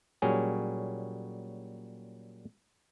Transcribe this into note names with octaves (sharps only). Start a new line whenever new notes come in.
A#2 F#3 G3 C#4 G#4